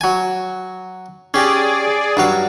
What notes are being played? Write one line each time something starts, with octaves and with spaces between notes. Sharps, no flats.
F#3 G#5
C#4 G4 G#4 D5
G2 F#3 F5